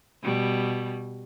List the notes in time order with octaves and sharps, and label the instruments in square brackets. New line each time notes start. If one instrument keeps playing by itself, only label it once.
[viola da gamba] B2 G3